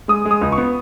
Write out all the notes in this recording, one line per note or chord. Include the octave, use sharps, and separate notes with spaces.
G#3 D#6
G#3
D#6
C#2
C#6
B3